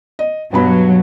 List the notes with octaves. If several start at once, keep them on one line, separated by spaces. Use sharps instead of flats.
D#5
G2 B2 F#3 B5